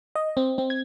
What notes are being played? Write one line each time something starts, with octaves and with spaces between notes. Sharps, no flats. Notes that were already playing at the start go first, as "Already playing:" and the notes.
D#5
C4
C4
G#6